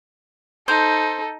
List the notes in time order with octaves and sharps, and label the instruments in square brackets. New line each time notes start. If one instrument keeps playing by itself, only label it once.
[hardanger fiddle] D#4 [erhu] A4 [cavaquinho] C5